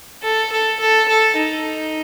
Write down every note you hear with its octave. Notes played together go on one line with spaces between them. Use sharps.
A4
A4
A4
A4
D#4